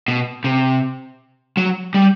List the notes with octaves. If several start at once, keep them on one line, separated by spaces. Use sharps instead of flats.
B2
C3
F#3
G3